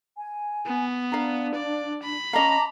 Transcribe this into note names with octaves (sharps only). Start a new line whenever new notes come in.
G#5
B3
D4 F5 A#5
D5
B5
C#4 D#5 F5 A5 A#5 D6